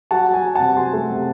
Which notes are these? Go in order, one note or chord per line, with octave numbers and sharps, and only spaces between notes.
F#3 F#5 A5
F#3
G#5
F#3
C3 F#5 A5
F#3 G#5 C6
A3
C3